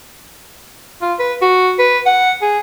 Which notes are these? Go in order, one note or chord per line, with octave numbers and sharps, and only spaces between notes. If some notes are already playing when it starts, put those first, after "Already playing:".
F4
B4
F#4
B4
F#5
G#4